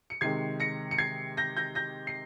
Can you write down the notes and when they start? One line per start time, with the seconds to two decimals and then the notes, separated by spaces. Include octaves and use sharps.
0.10 C#7
0.21 C3 D#3 G#3 G#6 C7
0.60 A#6 C#7
0.91 C#7
0.98 G#6 C7
1.37 G6 A#6
1.57 G6 A#6
1.75 G6 A#6
2.07 C7